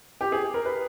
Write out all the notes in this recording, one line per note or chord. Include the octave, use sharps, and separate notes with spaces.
G4
G#4
A#4
B4